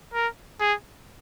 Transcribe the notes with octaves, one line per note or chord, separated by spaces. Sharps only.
A#4
G#4